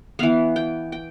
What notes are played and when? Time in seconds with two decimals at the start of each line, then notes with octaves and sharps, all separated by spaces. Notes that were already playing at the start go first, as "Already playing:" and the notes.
0.19 E3 B3 F5
0.56 G5
0.92 G5